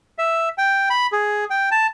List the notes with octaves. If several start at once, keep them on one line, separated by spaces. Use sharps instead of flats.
E5
G5
B5
G#4
G5
A5